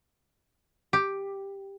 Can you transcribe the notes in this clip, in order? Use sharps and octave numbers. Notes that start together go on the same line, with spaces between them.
G4